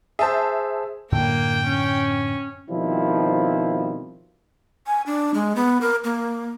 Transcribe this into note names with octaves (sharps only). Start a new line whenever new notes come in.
G#4 C5 E5 A5
F#2 A2 D3 A#3 G5
C#4
B2 D#3 F3 G3 C4 E4
G#5
D4
G#3
B3
A#4
A#3